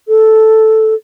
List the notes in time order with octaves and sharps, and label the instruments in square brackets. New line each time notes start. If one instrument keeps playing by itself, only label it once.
[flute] A4